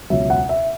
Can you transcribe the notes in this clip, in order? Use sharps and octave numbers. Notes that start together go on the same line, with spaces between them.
C#2 B2 F#3 E5
F#5
E5